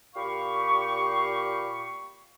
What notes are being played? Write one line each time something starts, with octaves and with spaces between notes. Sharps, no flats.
A#2 G4 F5 B5 C#6